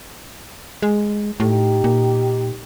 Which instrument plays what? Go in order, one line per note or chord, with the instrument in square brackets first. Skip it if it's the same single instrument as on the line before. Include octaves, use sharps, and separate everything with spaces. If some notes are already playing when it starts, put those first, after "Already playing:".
[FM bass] G#3
[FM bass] A2 [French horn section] D#4 G4
[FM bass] A#2